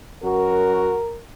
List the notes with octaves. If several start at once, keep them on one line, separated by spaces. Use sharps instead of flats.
F#2 F#4 A#4